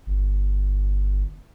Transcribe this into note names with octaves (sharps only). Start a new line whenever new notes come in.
G1